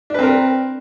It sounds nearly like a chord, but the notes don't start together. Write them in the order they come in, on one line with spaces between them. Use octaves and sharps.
D4 B4 C4 A#4